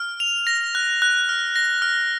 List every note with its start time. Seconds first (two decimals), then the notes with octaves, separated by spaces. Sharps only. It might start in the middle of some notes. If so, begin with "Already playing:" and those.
Already playing: F6
0.20 F7
0.47 A#6
0.75 F#6
1.02 F#6
1.29 F6
1.56 A#6
1.82 F6